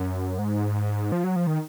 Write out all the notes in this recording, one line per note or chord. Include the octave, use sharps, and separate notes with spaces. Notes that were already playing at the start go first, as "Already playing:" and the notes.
Already playing: F#2
G#2
F3
F#3
F3
D#3